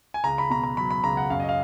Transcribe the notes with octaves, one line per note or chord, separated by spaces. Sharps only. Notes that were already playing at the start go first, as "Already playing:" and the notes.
G#5
C#2 A#5
B5
B2 A#5
A#5
F#3 B5
B5
C#2 A#5
F#5
F#2 F5
D#5
F5